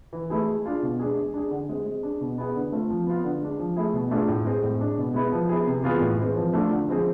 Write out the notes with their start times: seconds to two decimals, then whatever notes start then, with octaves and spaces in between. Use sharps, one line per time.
0.13 E3
0.30 A3 E4 G#4
0.47 G#3
0.65 D4 F4 G#4
0.82 B2
0.99 G#3 D4 G#4
1.17 G#3
1.34 D4 G#4
1.51 D3
1.69 G#3 C4
1.86 G#3
2.03 D4 G#4
2.21 B2
2.38 B3 E4 G#4
2.55 D3
2.72 A3 C4 F4
2.90 F3
3.06 B3 F4
3.24 D3
3.42 G#3 D4
3.59 F3
3.76 A3 E4 G#4
3.93 B2
4.11 A3 D4 F4 G#4
4.28 A2
4.45 G#3 C4 G#4
4.63 A2
4.80 G#3 D4
4.97 B2
5.14 G#3 B3 E4
5.32 F3
5.49 B3 E4 G#4
5.66 C3
5.83 E3 B3 F4 G#4
6.00 A2
6.19 E3 G#3 C4
6.36 F3
6.53 A3 D4 F4
6.71 D3
6.88 F3 G#3 C4 G#4